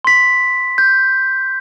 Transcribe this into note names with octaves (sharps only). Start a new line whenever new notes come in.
C6 B6
G6